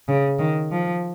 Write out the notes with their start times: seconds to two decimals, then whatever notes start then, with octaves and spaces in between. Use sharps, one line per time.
0.09 C#3
0.39 D#3
0.72 F3